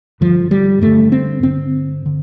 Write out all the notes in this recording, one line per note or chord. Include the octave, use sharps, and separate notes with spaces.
G2 D3 F3
G3
G2 D3 A3
C4
G2 D3 C4
D3